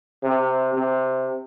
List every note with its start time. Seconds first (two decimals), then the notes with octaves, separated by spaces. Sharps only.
0.23 C3
0.74 C3